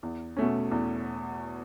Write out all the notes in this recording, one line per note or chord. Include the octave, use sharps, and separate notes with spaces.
E2
B2 A3 C#4
E2